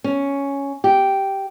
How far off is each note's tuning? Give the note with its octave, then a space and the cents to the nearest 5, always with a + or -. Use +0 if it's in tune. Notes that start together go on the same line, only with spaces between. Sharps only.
C#4 +5
G4 -5